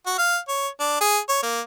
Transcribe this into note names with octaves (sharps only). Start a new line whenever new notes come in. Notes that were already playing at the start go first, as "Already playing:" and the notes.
F#4
F5
C#5
D4
G#4
C#5
A#3